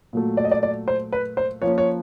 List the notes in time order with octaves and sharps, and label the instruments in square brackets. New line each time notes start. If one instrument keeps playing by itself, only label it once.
[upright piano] A#2 F#3 A3
D5
D#5
D5
D5
C5
B4
C5
F3 A#3 C#4 C#5
C#5